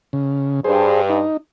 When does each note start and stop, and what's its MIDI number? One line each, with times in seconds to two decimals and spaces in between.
0.13 0.60 49
0.64 1.19 43
0.64 1.01 68
0.64 1.01 72
1.10 1.37 63